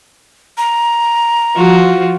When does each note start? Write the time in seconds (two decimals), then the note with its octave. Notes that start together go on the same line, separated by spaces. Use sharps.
0.58 A#5
1.56 F3 F4 F#4